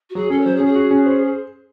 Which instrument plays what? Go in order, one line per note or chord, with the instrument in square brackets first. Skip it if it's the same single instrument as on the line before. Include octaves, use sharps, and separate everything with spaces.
[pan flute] F#4
[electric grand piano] F#3 [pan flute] G#4
[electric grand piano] C#4 [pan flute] A4
[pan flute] C#5
[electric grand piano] F#3 [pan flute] C5
[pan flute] G#4
[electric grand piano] C#4
[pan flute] G#4
[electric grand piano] F#4
C#4
C5